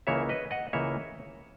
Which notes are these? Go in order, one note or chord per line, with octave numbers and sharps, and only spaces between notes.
C#2 C#3 E3 A#3 C#5 E5
B4 D#5
D#5 F#5
C#2 C#3 E3 A#3 C#5 E5